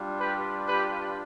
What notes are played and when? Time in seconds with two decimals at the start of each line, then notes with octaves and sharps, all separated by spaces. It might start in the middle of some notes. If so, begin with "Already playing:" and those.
Already playing: G3 D4 F4
0.20 G4 B4
0.68 G4 B4